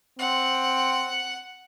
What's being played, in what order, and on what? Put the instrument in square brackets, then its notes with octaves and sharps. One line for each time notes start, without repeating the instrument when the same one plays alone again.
[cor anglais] C4 [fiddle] F#5